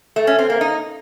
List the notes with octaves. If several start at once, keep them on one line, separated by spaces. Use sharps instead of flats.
A3
C#4
C4
A#3
D#4